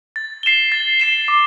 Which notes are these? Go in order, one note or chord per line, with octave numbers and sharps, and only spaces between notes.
A6
C7 E7 G7
A6
C7 E7 G7
D6